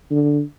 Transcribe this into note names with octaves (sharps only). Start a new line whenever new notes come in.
D3